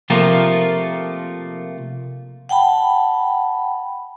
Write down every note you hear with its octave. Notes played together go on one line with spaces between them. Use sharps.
C3 F3 A3 A#3 F4 A#4
F#5 G5 A5 B5